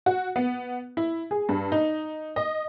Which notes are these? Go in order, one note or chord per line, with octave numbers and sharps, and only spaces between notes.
F#4
B3
E4
G#4
G2
D#4
D#5